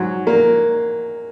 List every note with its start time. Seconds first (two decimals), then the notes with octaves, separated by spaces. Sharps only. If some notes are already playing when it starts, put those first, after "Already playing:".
Already playing: G#2 F#3
0.27 A#3